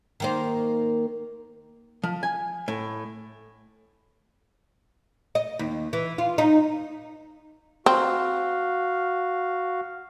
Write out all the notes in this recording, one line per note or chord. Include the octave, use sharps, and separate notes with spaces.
D#3 A#3 C5
F3
G#5
A2
D#5
D#2
E3
F4
D#4
C4 F#4 F5